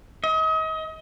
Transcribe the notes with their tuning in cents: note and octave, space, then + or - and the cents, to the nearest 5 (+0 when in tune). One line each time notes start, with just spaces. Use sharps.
D#5 +35